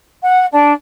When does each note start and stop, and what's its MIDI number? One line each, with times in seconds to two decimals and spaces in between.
0.24 0.45 78
0.51 0.72 62